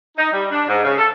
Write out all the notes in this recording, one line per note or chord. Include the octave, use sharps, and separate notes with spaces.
D#4
G3
D4
G#2
C#3
A4